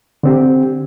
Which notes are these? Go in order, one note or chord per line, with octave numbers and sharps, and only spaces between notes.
D3 C4 G4